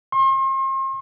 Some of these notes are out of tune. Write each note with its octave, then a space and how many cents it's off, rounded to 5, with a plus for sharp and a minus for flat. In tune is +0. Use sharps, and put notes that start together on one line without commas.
C6 +40